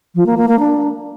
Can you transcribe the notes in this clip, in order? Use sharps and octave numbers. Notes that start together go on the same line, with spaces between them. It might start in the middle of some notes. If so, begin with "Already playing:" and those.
F3
A#3
A#3
A#3
D4